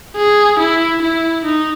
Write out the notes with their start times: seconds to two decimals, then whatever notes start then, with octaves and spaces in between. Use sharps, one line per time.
0.16 G#4
0.59 E4
1.02 E4
1.45 D#4